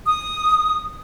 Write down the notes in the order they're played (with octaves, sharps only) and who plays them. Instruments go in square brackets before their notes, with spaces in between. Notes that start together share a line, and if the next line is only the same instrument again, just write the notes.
[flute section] D#6